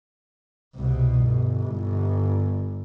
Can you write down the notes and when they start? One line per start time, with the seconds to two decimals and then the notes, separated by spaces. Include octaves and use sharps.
0.75 C2 B2
1.22 G1